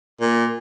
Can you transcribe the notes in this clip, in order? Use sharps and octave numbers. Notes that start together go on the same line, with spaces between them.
A#2